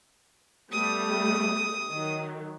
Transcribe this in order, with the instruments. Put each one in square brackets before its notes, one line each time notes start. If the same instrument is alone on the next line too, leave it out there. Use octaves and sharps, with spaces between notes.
[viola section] G3 A3 B3 [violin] D#6
[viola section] D#3 F#3